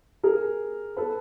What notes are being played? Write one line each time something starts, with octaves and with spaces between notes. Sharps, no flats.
G#4 A#4
A4 B4